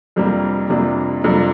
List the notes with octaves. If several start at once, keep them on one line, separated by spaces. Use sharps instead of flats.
F2 C3 G3 A#3 D4
F2 C3 G3 A#3 D4
F2 C3 G3 A#3 D4